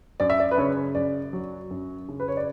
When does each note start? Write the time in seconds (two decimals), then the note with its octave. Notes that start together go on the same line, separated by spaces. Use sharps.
0.20 F#2 D5
0.30 E5
0.40 D5
0.51 B4
0.58 C#3 C#5
0.95 F#2 D5
1.33 F#3
1.71 F#2
2.08 C#3
2.20 B4
2.28 C#5
2.37 D5